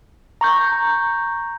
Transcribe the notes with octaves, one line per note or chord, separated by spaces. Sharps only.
A#5 C#6 G6